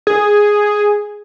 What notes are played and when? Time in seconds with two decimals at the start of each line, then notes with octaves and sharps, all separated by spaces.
0.07 G#4